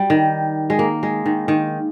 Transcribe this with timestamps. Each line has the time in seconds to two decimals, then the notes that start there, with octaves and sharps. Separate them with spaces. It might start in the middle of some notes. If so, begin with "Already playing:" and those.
Already playing: G3
0.10 D#3
0.70 G#3
0.79 A#3
1.03 G#3
1.26 D#3
1.48 D#3